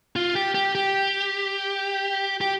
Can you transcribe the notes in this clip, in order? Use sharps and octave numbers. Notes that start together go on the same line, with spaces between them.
F4
G4
G4
G4
G4